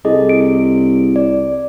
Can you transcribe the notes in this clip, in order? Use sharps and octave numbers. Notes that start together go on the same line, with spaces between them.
C2 G#4 A4 D#5
D7
D5